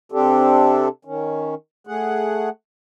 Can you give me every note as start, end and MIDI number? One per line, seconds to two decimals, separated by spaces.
0.12 0.88 48
0.12 0.88 60
0.12 0.88 62
0.12 0.88 67
0.12 0.88 69
1.05 1.55 51
1.05 1.55 61
1.87 2.49 57
1.87 2.49 68
1.87 2.49 78